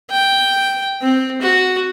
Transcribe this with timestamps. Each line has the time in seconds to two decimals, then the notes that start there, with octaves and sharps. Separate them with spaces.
0.11 G5
1.02 C4
1.42 F#4